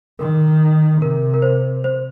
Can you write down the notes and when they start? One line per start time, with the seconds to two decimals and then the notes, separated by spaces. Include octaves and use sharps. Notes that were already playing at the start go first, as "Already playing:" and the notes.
0.19 D#3 A#4
1.01 C3 A#4
1.34 A#4
1.42 C5
1.84 C5